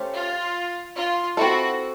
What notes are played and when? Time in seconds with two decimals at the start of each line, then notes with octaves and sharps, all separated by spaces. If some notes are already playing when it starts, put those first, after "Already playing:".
Already playing: A3 C#4 G4 C5
0.13 F4
0.95 F4
1.37 C4 E4 F#4 A4